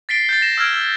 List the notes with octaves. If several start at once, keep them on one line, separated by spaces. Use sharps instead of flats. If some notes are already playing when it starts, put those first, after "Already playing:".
A6 B6 C7 D7 G7
G6 A6
A#6 E7
E6 F6 G#6 D7
E6